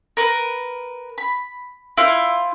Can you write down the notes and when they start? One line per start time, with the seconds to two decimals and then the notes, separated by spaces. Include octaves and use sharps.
0.17 A#4 B4
1.18 B5
1.97 E4 F4 C5 F5